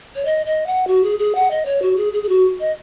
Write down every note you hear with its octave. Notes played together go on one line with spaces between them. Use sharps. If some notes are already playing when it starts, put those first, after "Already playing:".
C#5
D#5
D#5
F#5
F#4
G#4
G#4
F#5
D#5
C#5
F#4
G#4
G#4
G#4
F#4
D#5